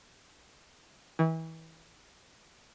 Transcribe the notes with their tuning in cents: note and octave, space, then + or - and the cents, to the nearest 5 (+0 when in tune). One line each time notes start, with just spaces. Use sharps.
E3 -30